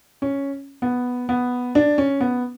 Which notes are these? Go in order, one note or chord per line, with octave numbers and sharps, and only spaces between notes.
C#4
B3
B3
D4
C#4
B3